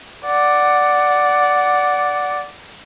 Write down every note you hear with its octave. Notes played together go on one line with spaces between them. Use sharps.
D5 F#5